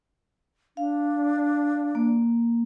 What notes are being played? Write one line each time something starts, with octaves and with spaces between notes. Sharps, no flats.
D4 F5
A#3